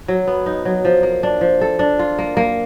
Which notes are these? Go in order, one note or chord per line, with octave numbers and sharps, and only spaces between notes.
F#3
B3
D#4
F#3
F3
A#3
D4
F3
A4
D4
F4
A#3
A#3